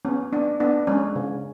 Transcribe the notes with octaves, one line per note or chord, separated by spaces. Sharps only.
B3 C#4
B3 D4
B3 D4
G#3 C#4
C#3